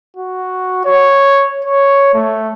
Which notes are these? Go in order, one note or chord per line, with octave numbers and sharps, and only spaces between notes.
F#4
C#5
C#5
A3